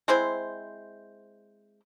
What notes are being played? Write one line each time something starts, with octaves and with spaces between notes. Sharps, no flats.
G#3 C4 E4 C5